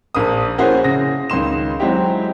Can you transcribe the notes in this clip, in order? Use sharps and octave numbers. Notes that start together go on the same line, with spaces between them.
A#1 A#3 D#6
A#3 C#4 E4 F#4 G#4 C5
C#3 A#6
C#2 D#3 C6 E7
F#3 G#3 C4 E4 G4